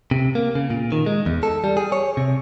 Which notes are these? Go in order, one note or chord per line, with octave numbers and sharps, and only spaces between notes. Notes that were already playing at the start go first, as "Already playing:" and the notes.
C3
A#3
C#3
A#2
D#3
G#3
E2
A4
G3
G#4
C#5
C3